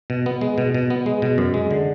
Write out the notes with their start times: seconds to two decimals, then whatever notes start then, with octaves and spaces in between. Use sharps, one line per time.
0.10 B2
0.26 B3
0.41 G#3
0.58 B2
0.74 B2
0.90 B3
1.06 G#3
1.22 B2
1.38 F#2
1.54 G#3
1.71 D3